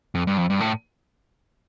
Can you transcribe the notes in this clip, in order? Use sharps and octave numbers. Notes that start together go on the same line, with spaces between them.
F2
G2
F2
G2
A2